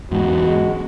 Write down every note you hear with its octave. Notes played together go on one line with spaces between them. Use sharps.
E2 G#2 F#4
G#3